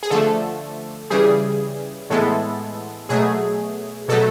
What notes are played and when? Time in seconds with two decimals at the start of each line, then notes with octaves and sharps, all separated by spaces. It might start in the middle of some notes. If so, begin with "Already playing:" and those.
0.03 G#4
0.10 D3 F3 A3 A4
1.10 C#3 E3 G3 G#4
2.10 A2 E3 G#3 B3 A4
3.09 B2 F#3 A3 G#4
4.08 B2 F#3 A3 A4